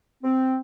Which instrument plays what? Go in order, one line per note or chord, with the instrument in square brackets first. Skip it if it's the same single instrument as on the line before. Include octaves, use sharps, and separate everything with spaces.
[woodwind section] C4